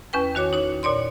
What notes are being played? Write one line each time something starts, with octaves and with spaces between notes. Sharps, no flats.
E2 C#4 B4 G5
D#3 F#4 C#5 D6
D#4 C#5
A#2 C#5 D5 C6